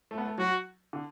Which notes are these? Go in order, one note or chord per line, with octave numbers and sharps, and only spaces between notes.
A3
B3
A3
F#3 F#4
D3